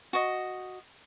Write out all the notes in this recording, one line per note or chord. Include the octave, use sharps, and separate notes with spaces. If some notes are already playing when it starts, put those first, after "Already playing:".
F#4 D#5